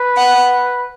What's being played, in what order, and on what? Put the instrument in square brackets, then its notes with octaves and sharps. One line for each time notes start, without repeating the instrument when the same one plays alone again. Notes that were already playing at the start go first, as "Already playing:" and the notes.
Already playing: [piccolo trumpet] B4
[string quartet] F#5